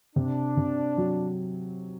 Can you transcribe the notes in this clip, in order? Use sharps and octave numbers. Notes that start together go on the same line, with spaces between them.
C3 D4
C3
F#3